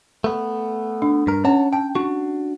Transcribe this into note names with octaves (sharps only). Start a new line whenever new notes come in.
A3 B3
D4
G2 A#4
C#4 C#5 F#5 A5
G5 A5
D4 F#4 C#6